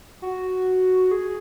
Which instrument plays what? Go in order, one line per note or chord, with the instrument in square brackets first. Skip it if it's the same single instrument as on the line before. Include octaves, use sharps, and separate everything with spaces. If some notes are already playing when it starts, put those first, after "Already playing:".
[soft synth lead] F#4
G#4